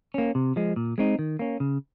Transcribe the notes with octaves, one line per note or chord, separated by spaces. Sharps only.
A#3 C#4
C3
F3 G#3
A#2
G#3 C4 D#4
D#3
A#3 C#4
C#3